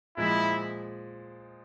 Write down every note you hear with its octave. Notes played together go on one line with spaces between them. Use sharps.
A#2 F3 G#3 E4